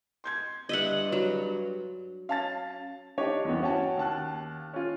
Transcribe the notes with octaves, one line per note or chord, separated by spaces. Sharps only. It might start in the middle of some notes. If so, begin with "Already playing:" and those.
C6 G6 G#6
G2 D#5 E5 F#5
F#3
C#4 F5 A5 A6
D4 D#4 G4 C#5 D#5
E2 G2 B3
C#4 F#4 C#5 G5 A5
D#2 A5 F#6
C#4 F4